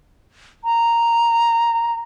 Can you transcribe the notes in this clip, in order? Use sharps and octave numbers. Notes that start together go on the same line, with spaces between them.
A#5